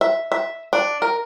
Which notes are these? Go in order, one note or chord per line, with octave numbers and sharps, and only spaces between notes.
E5
E5
D4
A#4